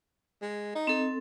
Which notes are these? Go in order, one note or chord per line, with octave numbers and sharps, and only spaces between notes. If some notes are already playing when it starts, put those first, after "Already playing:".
G#3
D#4
C4 A4